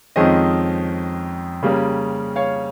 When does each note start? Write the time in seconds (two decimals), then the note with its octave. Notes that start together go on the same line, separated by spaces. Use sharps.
0.16 F2 D#3 G#3 C#4 C5 D#5
1.63 C#3 G3 A#3 C#4
2.36 C#5 F5